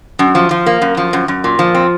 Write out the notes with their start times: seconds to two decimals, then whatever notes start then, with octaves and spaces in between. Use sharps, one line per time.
0.19 F#2
0.35 F3
0.51 F3
0.66 A#3
0.81 F#2
0.97 F3
1.13 F#2
1.28 F#2
1.44 A#2
1.59 F3
1.75 C4